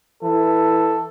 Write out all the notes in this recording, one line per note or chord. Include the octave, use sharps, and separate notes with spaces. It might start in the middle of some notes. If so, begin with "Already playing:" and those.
E3 A4